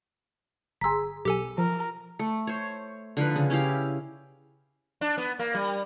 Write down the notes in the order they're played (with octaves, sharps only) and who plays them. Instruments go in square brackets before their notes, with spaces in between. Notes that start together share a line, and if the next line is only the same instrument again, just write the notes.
[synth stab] G1 G#4 [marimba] A#5 C6 [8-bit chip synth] E6 B6
[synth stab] B1 [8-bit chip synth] G4 A4 G#5
[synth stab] F3 [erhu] A#4
[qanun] A3
C5 C#5
D3 F3 D#4 B4
C#3
C#4 E4 G4 F5
[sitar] D4
B3
A#3
G3